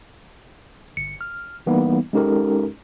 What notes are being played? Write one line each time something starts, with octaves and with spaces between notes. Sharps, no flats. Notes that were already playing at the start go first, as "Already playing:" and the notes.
G1 C#7
F6
E3 G3 A#3 B3 D#4
G#3 C#4 D#4 G4 A4 A#4